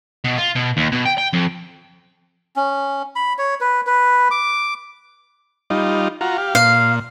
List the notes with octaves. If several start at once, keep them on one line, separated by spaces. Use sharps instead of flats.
B2
F4
B2
D#2
B2
G5
G5
F2
C#4
B5
C#5
B4
B4
D6
G3 D#4 F4
F4 F#4 A#5
G4 F5
A#2 F5